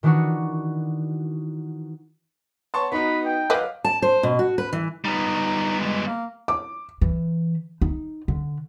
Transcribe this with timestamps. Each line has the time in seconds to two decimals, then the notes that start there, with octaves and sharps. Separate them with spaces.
0.03 D#3 E3 D4 D#4 F#4 C#6
2.74 B3 C#5 A5 C6 C#6
2.92 B3 D#4 F#4 B4
3.25 G5
3.50 F#3 B4 D#5 F5 D6
3.84 A5
4.02 C5
4.23 B2
4.39 F#4
4.58 B4
4.73 E3
5.04 G3 B3 D#4
5.79 G#3
6.07 A#3
6.48 D6
7.01 E3
7.81 D#4
8.28 D3